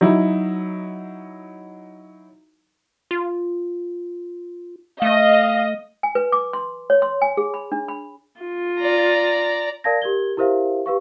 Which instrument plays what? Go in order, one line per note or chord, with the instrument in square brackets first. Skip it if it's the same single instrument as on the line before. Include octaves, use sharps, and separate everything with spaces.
[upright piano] F#3 D#4 E4
[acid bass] F4
[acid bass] A3 [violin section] D#5 [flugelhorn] F5
[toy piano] G#5
B4
D6
C6
C#5
C6
G#5
G#4
B5
D4
B5
[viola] F4
[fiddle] D5 A#5
[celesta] A#4 D5 F5 A5 G#6 A#6
G4 A#4 G#6 G7
E4 G4 A#4 C5 E5 F5
G4 B4 F5 C#6